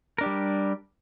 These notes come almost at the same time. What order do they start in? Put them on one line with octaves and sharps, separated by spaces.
A#4 D4 G4 G3